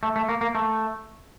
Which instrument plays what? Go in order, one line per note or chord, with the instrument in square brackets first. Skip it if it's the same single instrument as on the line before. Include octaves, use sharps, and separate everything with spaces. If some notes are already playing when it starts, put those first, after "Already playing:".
[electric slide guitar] A3
A3
A#3
A#3
A3